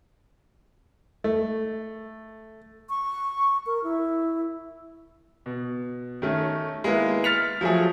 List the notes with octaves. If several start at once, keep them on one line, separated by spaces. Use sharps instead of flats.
A3
C#6
A#4
E4
B2
D#3 A3 C#4
G#3 A#3 B3 E4
F6 A6 B6 C#7 F7
F3 F#3 A3 G#4